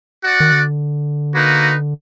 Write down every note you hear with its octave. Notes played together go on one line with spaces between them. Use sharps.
F#4 D5 F#5
D#3
D3
A#3 D#4 F#4 B4